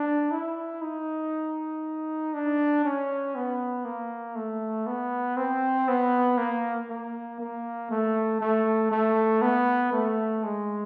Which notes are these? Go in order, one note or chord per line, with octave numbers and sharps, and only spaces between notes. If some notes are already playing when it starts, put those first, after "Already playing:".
Already playing: D4
E4
D#4
D4
C#4
B3
A#3
A3
B3
C4
B3
A#3
A#3
A#3
A3
A3
A3
B3
A3
G#3